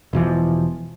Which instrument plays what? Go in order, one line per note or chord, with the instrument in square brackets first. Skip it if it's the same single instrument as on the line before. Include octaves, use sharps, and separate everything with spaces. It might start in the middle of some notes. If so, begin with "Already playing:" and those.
[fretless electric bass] E1 B2 E3 F3